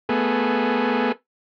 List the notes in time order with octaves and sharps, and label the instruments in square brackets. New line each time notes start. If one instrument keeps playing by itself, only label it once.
[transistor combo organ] A3 B3 G#4